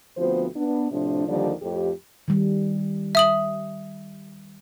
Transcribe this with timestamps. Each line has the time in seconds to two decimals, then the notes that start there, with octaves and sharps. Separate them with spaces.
0.17 D2 F3 B3 C4 F#4 C5
0.56 B3 D4
0.91 A2 C3 F3 D4
1.27 D#2 D3 D#3 F3 G3 D5
1.62 F2 A2 G4
2.28 D#3 G3
3.15 E5 D#6 F#7